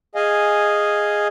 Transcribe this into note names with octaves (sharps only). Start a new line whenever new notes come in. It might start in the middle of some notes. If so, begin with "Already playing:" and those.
G#4 D#5 F5 G#5